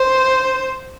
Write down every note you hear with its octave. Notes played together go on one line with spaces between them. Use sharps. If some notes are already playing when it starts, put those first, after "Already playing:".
Already playing: C5